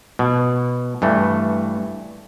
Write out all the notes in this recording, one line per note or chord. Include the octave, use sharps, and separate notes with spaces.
B2
G2 E3 A3